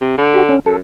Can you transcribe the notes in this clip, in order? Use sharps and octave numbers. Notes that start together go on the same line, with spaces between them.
C3
D3
F#4 G4
C#4
F#2 A4